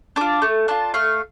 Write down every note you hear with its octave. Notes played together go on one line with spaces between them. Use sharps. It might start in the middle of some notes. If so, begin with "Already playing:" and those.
D4 F4 D6
A3
D4 F4 A5
A3 F5